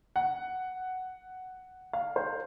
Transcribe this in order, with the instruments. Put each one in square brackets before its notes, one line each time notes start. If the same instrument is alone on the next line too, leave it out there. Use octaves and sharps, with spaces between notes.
[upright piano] F#5
F5
C5